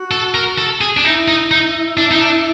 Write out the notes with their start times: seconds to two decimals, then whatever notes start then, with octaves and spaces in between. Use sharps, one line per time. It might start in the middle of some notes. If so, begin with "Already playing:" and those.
Already playing: F#4
0.11 A4
0.34 A#4
0.58 A4
0.81 G#4
0.97 D4
1.04 D#4 E4
1.28 D#4
1.51 D#4
1.97 D4
2.11 D#4
2.21 D4